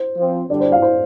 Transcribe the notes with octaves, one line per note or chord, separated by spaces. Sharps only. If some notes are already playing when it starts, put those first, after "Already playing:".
Already playing: C5
F3 C4
D3 G3 D4 D5
C5
F5
C5